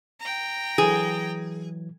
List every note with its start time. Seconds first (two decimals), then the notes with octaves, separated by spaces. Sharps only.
0.21 G5 A#5
0.78 E3 F#3 G#4